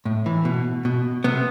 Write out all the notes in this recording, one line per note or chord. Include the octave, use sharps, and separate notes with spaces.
A2
E3
B2
B2
C3 B3